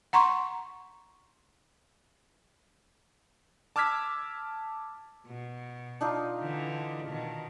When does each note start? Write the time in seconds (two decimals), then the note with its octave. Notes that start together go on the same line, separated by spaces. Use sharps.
0.13 F#5 A#5 C6 C#6
3.76 A5 D6 E6 F6 G#6 B6
5.27 B2
6.01 D4 D#4 F4
6.39 D3 E3
7.08 B2 D#3